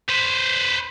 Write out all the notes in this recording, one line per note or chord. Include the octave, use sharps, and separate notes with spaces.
B4 C5